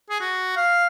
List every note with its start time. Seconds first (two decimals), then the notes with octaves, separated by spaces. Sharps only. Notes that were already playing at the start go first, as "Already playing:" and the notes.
0.10 G#4
0.21 F#4
0.57 F5